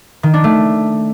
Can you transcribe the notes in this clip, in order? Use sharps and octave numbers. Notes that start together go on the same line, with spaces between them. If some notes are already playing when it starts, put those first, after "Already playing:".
D#3
D4
A3